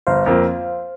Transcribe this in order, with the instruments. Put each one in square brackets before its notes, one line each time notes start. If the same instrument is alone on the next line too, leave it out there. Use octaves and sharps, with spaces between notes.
[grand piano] G1 [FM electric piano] C5 F5
[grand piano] F2 F3 A#3